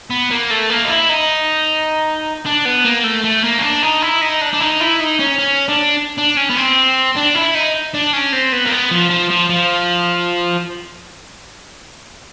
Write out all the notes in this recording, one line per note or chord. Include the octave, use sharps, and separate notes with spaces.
B3
A#3
A3
A#3
D#4
E4
D#4
D4
B3
A#3
A3
A3
A#3
C#4
D4
D#4
E4
D#4
D4
D4
D#4
E4
D#4
C#4
C#4
D4
D4
C#4
B3
C4
D4
E4
D#4
D4
C#4
C4
B3
A#3
B3
F3
F3
F3
F3